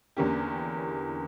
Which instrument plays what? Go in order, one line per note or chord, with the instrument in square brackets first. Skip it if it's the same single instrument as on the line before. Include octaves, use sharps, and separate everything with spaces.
[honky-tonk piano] E2 D3 A#3 C#4 G4